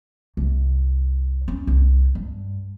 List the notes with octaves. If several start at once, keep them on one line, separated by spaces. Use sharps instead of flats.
C2
C#4
C2
G2